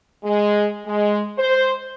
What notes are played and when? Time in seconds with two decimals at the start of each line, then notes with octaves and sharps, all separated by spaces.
0.24 G#3
0.86 G#3
1.38 C5